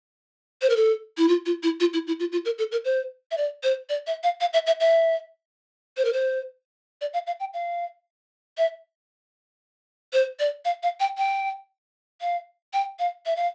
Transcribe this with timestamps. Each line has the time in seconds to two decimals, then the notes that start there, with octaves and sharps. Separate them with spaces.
0.62 C5
0.70 A#4
0.76 A4
1.18 E4
1.28 F4
1.46 F4
1.63 E4
1.80 F4
1.93 E4
2.07 E4
2.20 F4
2.32 F4
2.45 A#4
2.58 A4
2.72 A#4
2.85 C5
3.31 E5
3.37 D5
3.63 C5
3.89 D5
4.07 E5
4.23 F5
4.41 F5
4.53 E5
4.67 E5
4.80 E5
5.97 C5
6.05 A#4
6.13 C5
7.01 D5
7.14 F5
7.27 F5
7.40 G5
7.54 F5
8.58 E5
10.13 C5
10.40 D5
10.65 F5
10.83 F5
11.00 G5
11.18 G5
12.21 F5
12.73 G5
12.99 F5
13.26 E5
13.36 F5